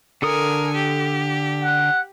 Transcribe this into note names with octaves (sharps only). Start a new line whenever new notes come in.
D3 A4 A#4 G#5 D#6
G4
F#5